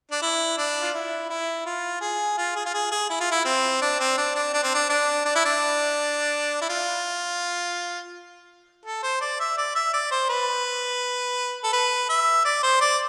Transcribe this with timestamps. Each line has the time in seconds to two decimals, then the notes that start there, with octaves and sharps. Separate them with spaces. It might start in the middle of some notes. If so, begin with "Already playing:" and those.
0.12 D4
0.22 E4
0.58 D4
0.82 F4
0.94 E4
1.30 E4
1.66 F4
2.01 G#4
2.38 F4
2.56 G#4
2.66 F4
2.74 G#4
2.92 G#4
3.10 E4
3.21 F4
3.32 E4
3.45 C4
3.82 D4
4.00 C4
4.18 D4
4.35 D4
4.54 D4
4.64 C4
4.75 D4
4.90 D4
5.26 D4
5.36 E4
5.45 D4
6.62 E4
6.70 F4
8.86 A4
9.03 C5
9.21 D5
9.40 E5
9.58 D5
9.76 E5
9.94 D5
10.12 C5
10.29 B4
11.64 A4
11.73 B4
12.09 E5
12.45 D5
12.63 C5
12.81 D5